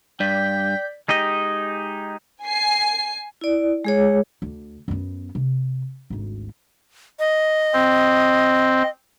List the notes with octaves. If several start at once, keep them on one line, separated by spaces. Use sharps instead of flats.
G2 D5 G5 G6 B6
G#3 D#4 G4 D#5
G#5 C7
E4 D5
G#3 G#4 C#5
D2
F#2 B3
C3
G#1 D2
D#5
C4